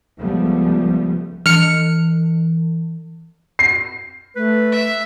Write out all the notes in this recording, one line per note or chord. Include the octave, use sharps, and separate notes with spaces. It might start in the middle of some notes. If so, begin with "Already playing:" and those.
C#2 F3 G3 A3 B3
E3 F6 C#7
C7
A3 B4
E5